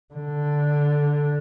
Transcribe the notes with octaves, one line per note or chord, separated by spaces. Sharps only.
D3